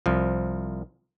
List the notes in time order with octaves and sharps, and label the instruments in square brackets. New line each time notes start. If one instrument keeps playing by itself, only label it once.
[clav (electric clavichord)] C2 F3